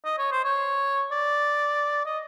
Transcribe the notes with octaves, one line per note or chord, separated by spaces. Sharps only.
D#5
C#5
C5
C#5
D5
D#5